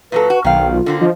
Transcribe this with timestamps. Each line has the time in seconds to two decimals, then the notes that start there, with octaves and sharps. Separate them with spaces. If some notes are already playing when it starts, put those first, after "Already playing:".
0.12 A#2 F#3 A4 B4
0.30 F#4
0.45 B1 D#3 F5 G5
0.71 F4
0.86 D3 A#3 C4
1.01 F3 D#5